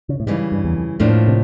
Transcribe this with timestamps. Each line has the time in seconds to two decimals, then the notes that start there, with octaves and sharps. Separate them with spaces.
0.09 C#3
0.20 A2
0.27 G#2 C#3 E3 G3
0.52 G2
0.65 E2
0.76 F2
1.00 F2 A2 F3 A#3 D4
1.28 C3